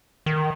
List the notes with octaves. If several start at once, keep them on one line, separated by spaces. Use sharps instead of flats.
D#3